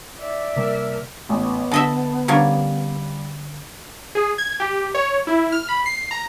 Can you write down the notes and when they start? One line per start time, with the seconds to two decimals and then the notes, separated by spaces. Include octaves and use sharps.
0.20 D5 E5
0.56 C3 G3 A#3 A#4
1.29 A1 B3
1.72 D3 D#5 E5 A5
2.28 D3 G3 A#3 C#4
4.15 G#4
4.38 G#6
4.60 G4
4.95 C#5
5.27 E4
5.52 F6
5.69 B5
5.86 C7
6.11 A#5